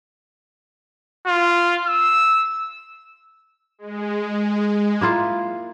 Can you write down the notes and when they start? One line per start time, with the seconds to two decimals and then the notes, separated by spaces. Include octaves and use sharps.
1.27 F4
1.87 E6
3.78 G#3
5.01 A#3 E4 F4